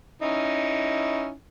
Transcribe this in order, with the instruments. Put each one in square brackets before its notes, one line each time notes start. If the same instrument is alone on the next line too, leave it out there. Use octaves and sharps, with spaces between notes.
[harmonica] C#4 D#4 E4